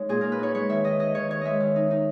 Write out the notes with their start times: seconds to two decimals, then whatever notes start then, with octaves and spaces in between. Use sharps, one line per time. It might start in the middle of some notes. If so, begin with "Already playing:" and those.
Already playing: G#3 D#4 C#5
0.09 A#2 G#4
0.21 A#2 A#4
0.32 B4
0.39 D#4 C#5
0.55 G#3 C#5
0.69 D#3 E5
0.84 D#3 D#5
0.99 D#4 D#5
1.15 D#3 C#5
1.30 D#3 C#5
1.41 G#3 D#5 E5
1.60 D#3
1.76 D#4
1.91 D#4